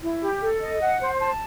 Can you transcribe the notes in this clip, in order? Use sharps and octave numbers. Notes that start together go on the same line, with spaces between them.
E4
G4
A4
D#5
F#5
C5
A5